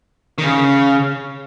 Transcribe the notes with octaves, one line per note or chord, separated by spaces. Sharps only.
D#3
C#3